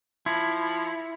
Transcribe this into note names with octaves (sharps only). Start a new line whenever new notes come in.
F3 E4